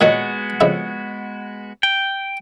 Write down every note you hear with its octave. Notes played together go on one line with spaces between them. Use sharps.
A#2 D#3 F#3 G#3 B3 F#4
F2 C#3 E4
G5